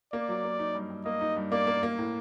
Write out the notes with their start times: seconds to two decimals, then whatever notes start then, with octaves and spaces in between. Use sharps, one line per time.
0.13 A#3 D5
0.29 F#3
0.44 A#3
0.59 D#4
0.75 G2
0.90 G2
1.05 A#3 D#5
1.21 D#4
1.36 G2
1.52 A#3 D5
1.67 A#3
1.83 A#3
1.98 A2